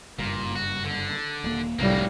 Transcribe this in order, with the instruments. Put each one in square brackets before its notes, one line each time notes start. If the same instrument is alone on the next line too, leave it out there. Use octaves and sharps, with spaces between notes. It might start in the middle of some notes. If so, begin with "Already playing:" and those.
[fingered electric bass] F#1 G2 [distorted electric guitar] A#2
[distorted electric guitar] F#4
D3
[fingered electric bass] D#1 A#3
[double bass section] F1 A2 G3 [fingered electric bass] C2 [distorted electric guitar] F#3 A#3